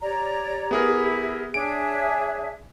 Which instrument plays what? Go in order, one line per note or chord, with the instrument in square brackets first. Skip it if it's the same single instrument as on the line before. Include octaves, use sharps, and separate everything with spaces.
[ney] G4 [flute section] C#5 D5 A#5
[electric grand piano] B3 G#4 A#4 [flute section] E4
[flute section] D4 G#4 E5 [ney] C#5 [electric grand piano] D7